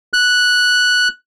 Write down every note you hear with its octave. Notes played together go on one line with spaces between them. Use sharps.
F#6